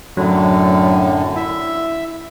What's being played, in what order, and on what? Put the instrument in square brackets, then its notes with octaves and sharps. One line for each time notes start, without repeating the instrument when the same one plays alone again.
[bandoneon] F#2 A2 D3 [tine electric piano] F#3
[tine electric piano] E4 [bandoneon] E5